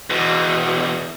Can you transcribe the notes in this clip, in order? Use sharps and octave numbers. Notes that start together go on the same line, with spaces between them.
E2 B2